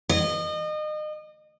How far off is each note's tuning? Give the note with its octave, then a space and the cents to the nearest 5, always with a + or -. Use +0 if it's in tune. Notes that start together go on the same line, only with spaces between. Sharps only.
D#5 -30